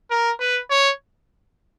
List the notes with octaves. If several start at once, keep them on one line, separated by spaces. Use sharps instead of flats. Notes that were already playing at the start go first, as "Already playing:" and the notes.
A#4
B4
C#5